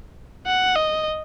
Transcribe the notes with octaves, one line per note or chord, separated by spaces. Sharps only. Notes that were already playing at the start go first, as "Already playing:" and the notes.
F#5
D#5